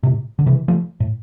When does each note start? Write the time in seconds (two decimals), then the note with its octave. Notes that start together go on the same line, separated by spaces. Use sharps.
0.03 A2 C3
0.39 D3
0.46 C3 E3
0.68 F3 A3
1.00 A2